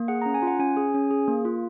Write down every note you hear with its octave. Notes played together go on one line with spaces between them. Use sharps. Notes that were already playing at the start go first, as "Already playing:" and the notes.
Already playing: A#3
G#4 F#5
A#5
C#4
G#5
F4
F#5
C#4 G#5
G#4
C#4
G#4
A#3
F4